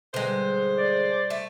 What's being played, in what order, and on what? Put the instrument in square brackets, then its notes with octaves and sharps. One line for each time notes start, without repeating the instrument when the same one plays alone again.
[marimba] B2 G3 [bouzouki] D3 G#3 [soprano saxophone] C5
[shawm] D5
[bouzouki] A3